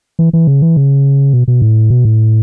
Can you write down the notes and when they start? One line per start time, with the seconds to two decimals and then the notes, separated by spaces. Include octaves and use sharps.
0.19 E3
0.33 E3
0.47 C#3
0.62 E3
0.76 C#3
1.33 B2
1.48 B2
1.62 A2
1.90 B2
2.05 A2